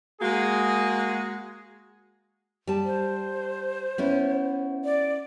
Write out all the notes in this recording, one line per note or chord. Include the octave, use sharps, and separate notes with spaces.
G#3 A#3 F#4 G#4
G3 A5
C5
B3 C#4 E4
D5